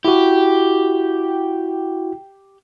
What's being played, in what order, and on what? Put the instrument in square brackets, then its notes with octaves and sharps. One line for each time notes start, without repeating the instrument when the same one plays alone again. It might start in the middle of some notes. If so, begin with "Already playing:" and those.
[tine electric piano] E4 F#4 [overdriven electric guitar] G4